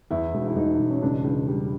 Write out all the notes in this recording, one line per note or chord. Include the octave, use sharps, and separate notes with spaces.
E2 E4
E1
E4
E1 D#4
E1
C#4
C#2 D4
C#2
G3